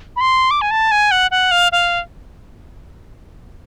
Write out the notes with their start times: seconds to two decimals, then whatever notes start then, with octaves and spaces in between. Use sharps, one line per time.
0.16 B5
0.21 C6
0.51 D6
0.61 G#5
0.71 A5
0.91 G#5
1.11 F#5
1.31 F#5
1.51 F5
1.72 F5